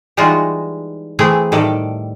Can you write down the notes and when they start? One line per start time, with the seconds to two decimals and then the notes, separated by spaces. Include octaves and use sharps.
0.17 E3 G3 G#3 D#4 F4 F#4
1.19 E3 A3 C4 G#4
1.52 A2 D#3 G3 A4 D5